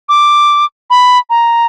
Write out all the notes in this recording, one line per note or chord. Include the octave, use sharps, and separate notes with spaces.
D6
B5
A#5